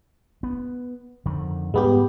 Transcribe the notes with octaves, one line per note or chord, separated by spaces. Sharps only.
B3
F2 D3 D#3
G#2 G3 G#3 B3 G4